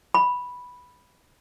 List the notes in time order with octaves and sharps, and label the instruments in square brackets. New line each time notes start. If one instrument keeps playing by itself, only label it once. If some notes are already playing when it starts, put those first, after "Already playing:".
[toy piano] B5